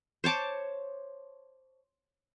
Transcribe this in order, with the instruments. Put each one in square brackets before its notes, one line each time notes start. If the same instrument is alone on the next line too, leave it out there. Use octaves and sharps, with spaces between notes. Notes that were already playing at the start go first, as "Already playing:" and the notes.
[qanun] C5 C#5 A5 D6